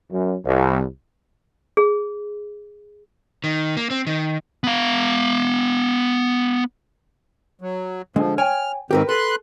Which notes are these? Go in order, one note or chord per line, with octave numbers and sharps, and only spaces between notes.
F#2
C2
G#4
D#3
A#3
C4
D#3
B3 F5
F#3
D3 F3 G#3
C#5 G5 G#5 F6
G#2 D#3 C4 G4 A#4 B4
A4 B4 C6 F#6